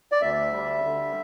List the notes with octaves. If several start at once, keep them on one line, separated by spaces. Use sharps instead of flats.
D5
D2 E5
G3
D3